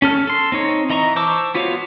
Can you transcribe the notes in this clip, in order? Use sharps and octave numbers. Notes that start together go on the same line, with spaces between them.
C#4 A4 F6
A4 C6
C4 D#4 C#5
E3 D#5 A#5 C#6
C5 A5 C#6 D6 E6
B3 F4 F#4 C#5 F5